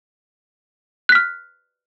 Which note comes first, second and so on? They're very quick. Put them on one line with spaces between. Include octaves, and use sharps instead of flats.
F#6 B6 F6